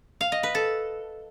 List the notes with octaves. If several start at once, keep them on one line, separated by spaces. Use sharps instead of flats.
F5
D#5
B4
A4